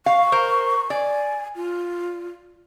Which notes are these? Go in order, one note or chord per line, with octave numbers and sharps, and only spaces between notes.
F5 C#6
A#4 C5
D5 G#5
F4